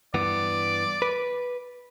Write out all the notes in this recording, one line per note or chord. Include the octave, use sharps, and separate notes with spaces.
G2 E3 B3 D5
B4